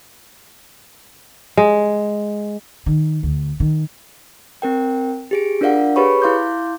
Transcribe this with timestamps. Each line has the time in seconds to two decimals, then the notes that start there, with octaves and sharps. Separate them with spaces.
1.57 G#3
2.86 D#3
3.23 D2
3.60 D#3
4.62 C4 A#4 G5
5.31 G4 G#4 D7
5.61 D4 F4 A#4 D5 F5 F#5
5.96 G4 G#4 B4 C#5 B5 C#6
6.22 E4 F5 C6 D6 G6